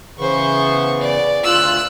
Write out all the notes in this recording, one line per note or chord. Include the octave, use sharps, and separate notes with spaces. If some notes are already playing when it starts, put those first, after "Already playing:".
C#3 E3 B3 C5 C#6
D5
D2 F4 E6 F#6